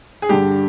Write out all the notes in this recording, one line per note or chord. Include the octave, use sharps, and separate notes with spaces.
G#4
G2 D3 G4